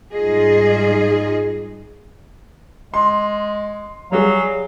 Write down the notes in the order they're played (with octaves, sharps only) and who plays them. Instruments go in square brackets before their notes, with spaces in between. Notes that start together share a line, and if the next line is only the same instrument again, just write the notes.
[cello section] G#2 G3 D#4 F4 G#4 D#5
[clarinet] G#3 [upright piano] C6
[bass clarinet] F#3 [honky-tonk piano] G3 G#4 [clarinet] F5